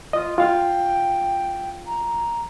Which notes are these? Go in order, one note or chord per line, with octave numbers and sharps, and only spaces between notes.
F4 D#5
F4 F5 G5
A#5